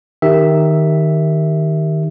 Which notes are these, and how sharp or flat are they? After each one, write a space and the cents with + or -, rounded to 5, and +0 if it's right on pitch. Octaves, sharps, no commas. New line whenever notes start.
D#3 +0 G4 +0 E5 +0